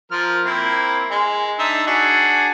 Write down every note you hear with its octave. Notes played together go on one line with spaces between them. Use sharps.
F3 A#4 F6
A#3 C4 E4
G#3
D4 D#4 E5
D4 F#4 G#4